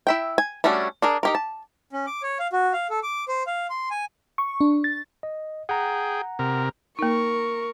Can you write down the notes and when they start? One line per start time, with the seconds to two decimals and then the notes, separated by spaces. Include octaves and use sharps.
0.07 E4 E5 G5
0.38 G#5
0.64 G3 A3 C#4 D4 F#4
1.02 D4 G#4 A#4
1.23 D#4 G4 A#4
1.35 A5
1.93 C#4
2.07 D6
2.23 C#5
2.39 F5
2.53 F#4
2.73 F5
2.90 A4
3.03 D6
3.28 C5
3.47 F5
3.70 C6
3.91 G#5
4.38 C#6
4.61 D4
4.84 A6
5.23 D#5
5.69 G#4 F#5 G5 A#5
6.39 C3 A#4
6.99 A#3 D#4 A#4 C#6